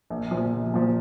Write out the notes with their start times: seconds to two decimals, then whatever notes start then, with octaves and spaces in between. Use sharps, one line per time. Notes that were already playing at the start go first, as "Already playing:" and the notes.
0.10 A#1
0.31 A#2 F3
0.53 A#1
0.74 A#2 F3